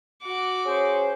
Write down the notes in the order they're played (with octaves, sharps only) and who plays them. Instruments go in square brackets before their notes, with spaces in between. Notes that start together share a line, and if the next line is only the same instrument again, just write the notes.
[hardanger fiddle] F#4 D6
[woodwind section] C#4 G#4 C5